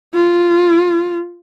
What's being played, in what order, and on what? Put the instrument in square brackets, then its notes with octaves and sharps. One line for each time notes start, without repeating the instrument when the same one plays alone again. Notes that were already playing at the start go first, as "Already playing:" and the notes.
[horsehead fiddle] F4